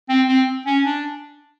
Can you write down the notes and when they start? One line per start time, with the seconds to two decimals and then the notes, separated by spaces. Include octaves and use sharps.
0.09 C4
0.28 C4
0.66 C#4
0.85 D4